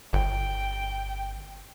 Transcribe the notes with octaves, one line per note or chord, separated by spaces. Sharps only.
G1 G5